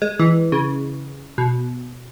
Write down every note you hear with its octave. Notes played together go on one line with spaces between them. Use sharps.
G#3
E3
C#3
B2